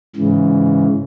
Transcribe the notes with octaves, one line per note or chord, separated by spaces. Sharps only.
G#2 C#3 E3